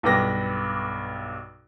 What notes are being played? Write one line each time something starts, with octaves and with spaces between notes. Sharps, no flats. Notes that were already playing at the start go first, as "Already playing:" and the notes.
B1 G2 B4 G5 D6 A#6